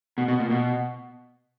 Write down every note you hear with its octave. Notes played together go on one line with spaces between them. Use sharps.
B2
B2
A#2
B2